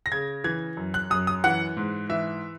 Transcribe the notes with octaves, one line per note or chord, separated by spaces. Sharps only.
A#6
C#3 G#6
E3 G#6
F#2
F#6
F#2 D#6
D#6
E3 F#5
G#2
E3 E5